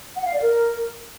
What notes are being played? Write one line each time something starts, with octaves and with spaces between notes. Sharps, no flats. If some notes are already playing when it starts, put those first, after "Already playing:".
F#5
F5
D5
A#4